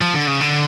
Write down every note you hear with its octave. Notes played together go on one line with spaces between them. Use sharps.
F3
D3
C#3
D3